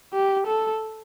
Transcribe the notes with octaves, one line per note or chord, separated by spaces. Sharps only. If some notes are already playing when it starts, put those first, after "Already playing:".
G4
A4